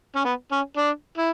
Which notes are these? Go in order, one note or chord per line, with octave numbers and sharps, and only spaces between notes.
C#4
B3
C#4
D4
E4